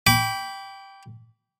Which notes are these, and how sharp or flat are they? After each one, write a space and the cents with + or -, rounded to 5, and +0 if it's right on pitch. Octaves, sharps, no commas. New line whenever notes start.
G5 +0 B5 +0 D6 -35